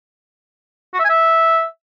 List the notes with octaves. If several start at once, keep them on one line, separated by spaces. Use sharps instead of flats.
F#4
E5
G#5
E5